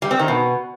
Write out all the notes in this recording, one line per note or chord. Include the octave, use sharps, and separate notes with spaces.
G3
C4
D#3
B2